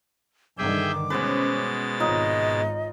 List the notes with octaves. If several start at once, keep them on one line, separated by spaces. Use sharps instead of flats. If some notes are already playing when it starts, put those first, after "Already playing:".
G2 D3 D#3 G#4 E5 G5 D6
B2 G#3 C#4 B4 C5 F#5 A6
G#1 D#4 F4 C#5 D#5